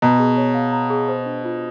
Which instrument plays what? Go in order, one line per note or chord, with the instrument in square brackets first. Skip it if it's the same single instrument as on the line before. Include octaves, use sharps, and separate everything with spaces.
[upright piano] B2 [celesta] A#5
[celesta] G#4
C#5
F5
A#5
G#4
C5
D4
F4